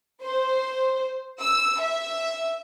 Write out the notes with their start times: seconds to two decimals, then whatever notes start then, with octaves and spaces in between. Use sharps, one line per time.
0.22 C5
1.41 E6
1.81 E5